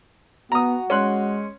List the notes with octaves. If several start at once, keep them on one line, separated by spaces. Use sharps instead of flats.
B3 F#4 A#5 D#6
G#3 C#4 C6 F#6